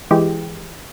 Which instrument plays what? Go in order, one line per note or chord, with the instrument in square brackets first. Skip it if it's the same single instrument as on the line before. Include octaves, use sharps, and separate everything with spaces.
[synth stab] E3 G#3 G4